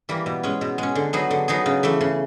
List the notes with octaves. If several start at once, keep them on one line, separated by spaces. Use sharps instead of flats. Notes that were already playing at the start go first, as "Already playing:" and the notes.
E3 G3 A#3
B2
G#3 C#4
B2
G#3 C#4
D3
F#3 B3 D#4 G#4
D3
F#3 B3 D#4 G#4
C#3
E3 A3
C#3